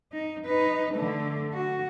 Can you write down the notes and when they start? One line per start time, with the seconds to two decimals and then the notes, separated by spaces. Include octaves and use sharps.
0.12 D#4
0.45 D#4 B4
0.94 D3 A3
1.54 F#4